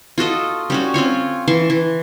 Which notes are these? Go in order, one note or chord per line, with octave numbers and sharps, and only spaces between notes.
F4 F#4 A4 D#5
G3 C#4 F#4
C4 C#4 F4 C#5
E3 A5 C6 C#6
E3